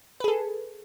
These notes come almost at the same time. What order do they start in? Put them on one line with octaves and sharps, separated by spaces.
B4 G#4 A4